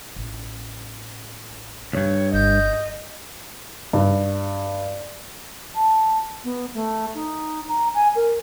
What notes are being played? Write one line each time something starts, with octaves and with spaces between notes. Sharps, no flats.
A1
D2 G2 C#5
G1 D#5 G6
G2
A5
B3
A3
D#4
A#5
G#5
A#4